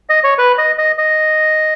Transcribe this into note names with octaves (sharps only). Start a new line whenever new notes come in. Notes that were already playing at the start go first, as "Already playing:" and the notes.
D#5
C#5
B4
D#5
D#5
D#5